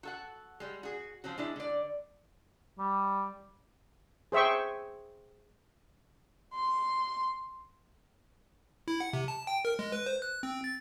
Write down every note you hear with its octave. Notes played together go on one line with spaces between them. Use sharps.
F#4 A4 F#5
G3 G#3
F#4 G#4
F3 C4 C#4 F#4
G#3 D4 E4
D3 D5
G3
G#4 C5 E5 G5 C#6
C6
E4
F#5
C3
A5
G5
A#4
G#3
B4
C5
F#6
C4
A6